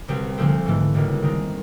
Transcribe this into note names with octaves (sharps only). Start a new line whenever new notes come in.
C2 B2 G3 C4
D2 D3 F3 A3 C4
G#2 E3 A3
C#2 B2 G3 A#3
D#3 G#3 C4 D#4